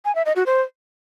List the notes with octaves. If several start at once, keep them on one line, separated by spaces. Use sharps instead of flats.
G#5
E5
D#5
F#4
C5